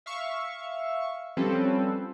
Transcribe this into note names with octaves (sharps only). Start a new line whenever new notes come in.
E5 F5 C#6
F3 G3 C4 C#4 A4 B4